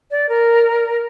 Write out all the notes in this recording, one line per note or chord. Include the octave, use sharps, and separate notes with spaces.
D5
A#4